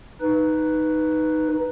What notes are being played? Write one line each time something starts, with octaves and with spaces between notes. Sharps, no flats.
D#4 B4